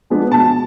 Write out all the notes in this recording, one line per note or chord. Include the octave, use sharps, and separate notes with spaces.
F3 G#3 B3 D4
B2 A5